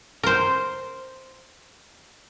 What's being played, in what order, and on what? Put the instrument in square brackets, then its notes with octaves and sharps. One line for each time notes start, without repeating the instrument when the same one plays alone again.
[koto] A#4 C5